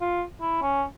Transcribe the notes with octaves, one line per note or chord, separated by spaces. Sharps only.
F4
E4
C#4